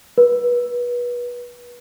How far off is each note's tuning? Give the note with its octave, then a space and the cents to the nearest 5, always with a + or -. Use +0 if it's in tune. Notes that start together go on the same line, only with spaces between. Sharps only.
B4 -25